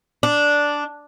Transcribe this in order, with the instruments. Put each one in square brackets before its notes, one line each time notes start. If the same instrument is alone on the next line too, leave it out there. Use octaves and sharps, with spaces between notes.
[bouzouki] D4